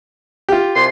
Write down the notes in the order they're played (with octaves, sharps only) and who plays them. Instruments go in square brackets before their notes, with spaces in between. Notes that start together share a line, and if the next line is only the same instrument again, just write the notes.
[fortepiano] F4 G4
[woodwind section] C2 C6